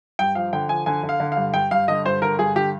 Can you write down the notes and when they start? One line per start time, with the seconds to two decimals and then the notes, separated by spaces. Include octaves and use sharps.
0.19 G2 G5
0.35 F3 F5
0.53 D3 G5
0.69 F3 G#5
0.86 D3 G#5
1.04 D3
1.09 F5
1.20 D3
1.32 F5
1.37 G2
1.54 G2 G5
1.71 G2 F5
1.88 D3 D#5
2.05 G2 C5
2.22 D3 A#4
2.39 G2 G#4
2.55 D3 G4